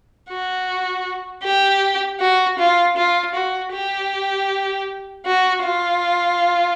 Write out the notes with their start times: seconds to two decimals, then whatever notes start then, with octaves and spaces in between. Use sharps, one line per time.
0.30 F#4
1.44 G4
2.20 F#4
2.59 F4
2.97 F4
3.35 F#4
3.73 G4
5.26 F#4
5.63 F4